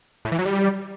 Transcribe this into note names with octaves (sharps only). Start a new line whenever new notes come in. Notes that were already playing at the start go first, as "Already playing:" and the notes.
A2
E3
F#3
G3